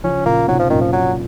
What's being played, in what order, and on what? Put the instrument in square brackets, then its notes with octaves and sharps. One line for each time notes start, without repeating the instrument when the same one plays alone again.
[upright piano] C#3 F3 [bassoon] C#4
[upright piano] A#2 C#3 [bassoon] A#3
[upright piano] G#2 C3 [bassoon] F#3
[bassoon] F3
[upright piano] F#2 A#2 [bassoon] D#3
[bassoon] F3
F#3